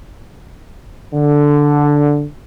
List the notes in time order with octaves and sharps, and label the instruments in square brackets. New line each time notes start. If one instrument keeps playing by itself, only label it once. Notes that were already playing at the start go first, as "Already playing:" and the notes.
[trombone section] D3